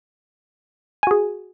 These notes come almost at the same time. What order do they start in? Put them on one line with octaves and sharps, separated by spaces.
G#5 F#4 G#4